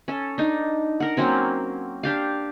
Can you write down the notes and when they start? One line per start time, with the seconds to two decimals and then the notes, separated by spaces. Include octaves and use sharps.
0.08 C#4 A4
0.38 D4 D#4
1.00 A#4 F#5
1.17 F#3 A#3 C4 C#4
2.03 D4 G4 F5